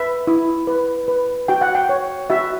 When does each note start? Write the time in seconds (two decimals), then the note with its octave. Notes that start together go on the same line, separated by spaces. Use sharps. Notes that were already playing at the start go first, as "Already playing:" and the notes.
Already playing: B4 E5
0.27 E4
0.67 B4
1.08 B4
1.48 F#4 G5
1.61 F#5
1.75 G5
1.89 C#5
2.30 F#4 E5